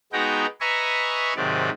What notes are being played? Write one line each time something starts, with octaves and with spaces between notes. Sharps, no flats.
G#3 B3 D#4 F#4 G5 A#5
B4 D#5 E5 G#5 A#5 C#6
G#2 C3 D#3 F#3 D5